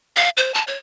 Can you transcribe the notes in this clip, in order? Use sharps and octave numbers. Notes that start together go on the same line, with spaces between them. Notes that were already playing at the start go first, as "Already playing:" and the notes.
F5
C5
A5
C#5